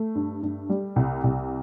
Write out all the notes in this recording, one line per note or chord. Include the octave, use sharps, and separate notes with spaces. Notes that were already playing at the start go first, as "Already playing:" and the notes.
Already playing: A3
G2
G2
G3
C2
C2